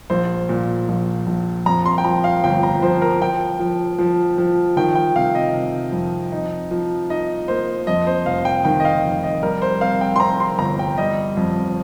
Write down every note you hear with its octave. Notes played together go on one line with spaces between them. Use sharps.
A#1 C5
A#2
A#1
A#1
F2 A#5
C6
G5
F3 A#5
F5
G1 G5
A#5
F3 C5
A#4
F3 G5
F3
F3
F3
D#3 G5
G5
C3 F5
D#5
C3
F2
D#4
F3
D#4 D#5
A#3 C5
F2 D#5
C5
F1 F5
G5
D#3 G5
D#5
F5
F1
D#5
G3 A#4
C5
C4 F5
G5
C6
C4 A#5
C6
G1 A#5
G5
G3 D#5
F2